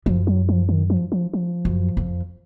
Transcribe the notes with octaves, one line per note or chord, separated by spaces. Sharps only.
F#2 F3
F#3
F3
D#3
F3
F3
F3
F#2
F2